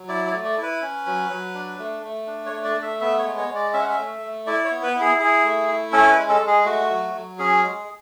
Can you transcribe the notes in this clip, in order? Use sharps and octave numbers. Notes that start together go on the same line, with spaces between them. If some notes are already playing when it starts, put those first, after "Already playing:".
Already playing: F#3
E4 D5
D5
A3
D5
E4
B4
C#4
F#3
F#3
D4
A3
A3
D4
C#5
A3
D5
A3
E5
B3 E5
C#5
G#3
C#5
G#3
D5
C#4 E5
F#5
E5
A3
A3
E4 D5
C#5
B3
B4
E4
G#4
E4 G#4
A3
E4
C#4 A4
B4
G#3
A4
G#3
G#4
A3 F#4
F#3
F#3
C#4 G#4
G#3